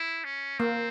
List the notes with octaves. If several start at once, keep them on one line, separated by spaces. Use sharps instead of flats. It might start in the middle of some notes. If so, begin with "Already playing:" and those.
Already playing: E4
C#4
A#3 C4